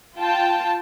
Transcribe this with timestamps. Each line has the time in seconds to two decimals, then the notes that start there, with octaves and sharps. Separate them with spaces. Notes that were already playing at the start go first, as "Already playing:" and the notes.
0.19 F4 G5 A5